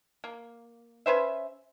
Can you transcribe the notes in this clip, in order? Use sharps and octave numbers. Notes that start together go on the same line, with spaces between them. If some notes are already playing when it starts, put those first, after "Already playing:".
A#3
C#4 B4 C5 E5